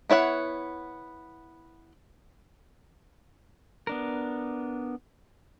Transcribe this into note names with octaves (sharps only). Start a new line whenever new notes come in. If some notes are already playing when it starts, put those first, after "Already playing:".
B3 E4 C#5 F#5
B3 D4 A#4